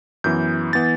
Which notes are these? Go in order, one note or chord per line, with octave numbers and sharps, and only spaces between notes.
F#2 E3 B3 G6
E3 B3 A6